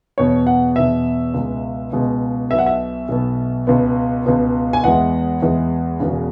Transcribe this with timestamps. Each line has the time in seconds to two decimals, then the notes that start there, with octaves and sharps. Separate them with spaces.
0.18 E2 B2 B3 C#5
0.47 F#5
0.76 E2 B2 B3 E5
1.34 C#2 B2 G#3
1.92 C#2 B2 G#3
2.51 B1 B2 B3 E5
2.59 F#5
2.66 E5
3.08 B1 B2 B3
3.67 C#2 B2 B3
4.26 C#2 B2 B3
4.73 G#5
4.84 E2 E3 G#3 F#5
5.42 E2 E3 G#3
6.00 E1 E2 C#3